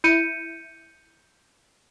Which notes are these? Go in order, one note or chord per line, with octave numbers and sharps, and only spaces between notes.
E4 G6 C#7 D#7